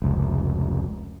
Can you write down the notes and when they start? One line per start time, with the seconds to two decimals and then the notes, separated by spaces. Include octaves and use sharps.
0.02 F1 C#2